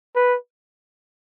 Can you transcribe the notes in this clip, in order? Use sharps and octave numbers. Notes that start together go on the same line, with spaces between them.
B4